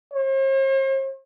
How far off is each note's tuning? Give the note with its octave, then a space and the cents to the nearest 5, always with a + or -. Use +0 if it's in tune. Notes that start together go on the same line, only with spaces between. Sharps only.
C5 +45